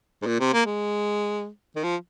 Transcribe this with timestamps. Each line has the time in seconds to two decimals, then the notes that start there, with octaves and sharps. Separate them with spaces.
0.22 G#2
0.26 A#2
0.40 C3
0.53 A#3
0.66 G#3
1.76 D#3
1.83 F3